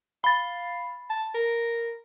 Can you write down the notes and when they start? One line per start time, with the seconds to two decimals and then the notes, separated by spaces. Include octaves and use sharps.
0.24 F5 B5 A6
1.09 A5
1.35 A#4